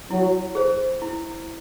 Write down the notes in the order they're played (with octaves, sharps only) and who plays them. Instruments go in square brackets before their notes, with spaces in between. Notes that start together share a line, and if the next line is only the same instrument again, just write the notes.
[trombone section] F#3 [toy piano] E4
[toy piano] G#4 C5
E4